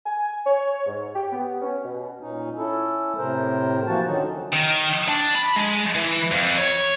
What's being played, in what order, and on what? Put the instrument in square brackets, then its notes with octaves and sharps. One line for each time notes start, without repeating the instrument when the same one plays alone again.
[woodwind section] G#5
C#5
G#2
G4
B3
C#4
B2
[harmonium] A#2 C#4 D#4
C#4 E4 A4
A2 C3 A#4 C5
E3 F3 A#3 F#4 A5
D3 D#3 F#3 C#4 D#4
[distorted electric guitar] D#3
D4
B5
G#3
E3
F2
C#5